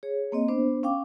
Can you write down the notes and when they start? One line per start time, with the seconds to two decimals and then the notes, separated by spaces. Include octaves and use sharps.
0.03 G#4 C#5
0.32 A#3 C4 D#5
0.48 B3 D4 C5
0.83 C#4 F5 G5 D6